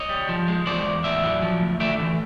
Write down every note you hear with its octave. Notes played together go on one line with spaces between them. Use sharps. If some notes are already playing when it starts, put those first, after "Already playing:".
Already playing: C#5 D#5
G3
F3
G#3
E2 C5 D5
E2
A2 D5 E5
F#3
F3
D2
A3 D5 E5
E3